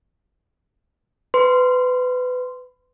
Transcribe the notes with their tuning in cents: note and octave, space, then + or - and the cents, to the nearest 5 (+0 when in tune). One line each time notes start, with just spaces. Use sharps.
B4 +25 C6 -10